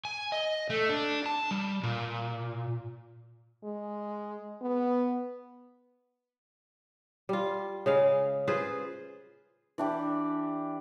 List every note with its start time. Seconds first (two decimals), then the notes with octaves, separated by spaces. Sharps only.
0.05 G#5
0.32 D#5
0.70 A3
0.89 D4
1.26 A5
1.51 G3
1.83 A#2
3.64 G#3
4.62 B3
7.29 G3 F4
7.86 C#3 G#3 F5
8.48 F4 G#4 B4 C5
9.78 E3 D4 G4